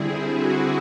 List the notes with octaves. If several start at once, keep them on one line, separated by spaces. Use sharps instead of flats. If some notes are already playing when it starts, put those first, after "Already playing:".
Already playing: D3 G3 C4 E4 G#4
F#4